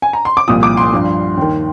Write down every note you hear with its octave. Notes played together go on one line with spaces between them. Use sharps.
G#5
A#5
C6
D6
C2 A#2 F3 D#6
D6
C6
G2 F3
D#2 D#3